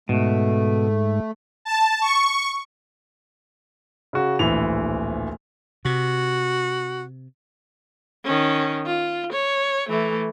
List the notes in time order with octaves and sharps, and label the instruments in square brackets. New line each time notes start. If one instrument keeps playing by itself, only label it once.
[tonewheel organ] G#2 [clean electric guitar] B2 [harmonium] A3
[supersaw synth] A5
C#6
[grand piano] C#3 F#4
D1 A#1 E3 F7
[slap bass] C3 [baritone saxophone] F#4
[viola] D#3 C#4
F4
C#5
E3 A3